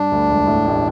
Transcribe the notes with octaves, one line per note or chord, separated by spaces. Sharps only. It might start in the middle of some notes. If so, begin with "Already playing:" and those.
Already playing: G2 D4
D2
E1
A2
A1